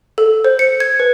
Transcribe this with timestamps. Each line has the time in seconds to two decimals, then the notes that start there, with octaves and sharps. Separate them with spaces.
0.18 A4
0.45 C5
0.59 C#7
0.80 G#6
1.00 B4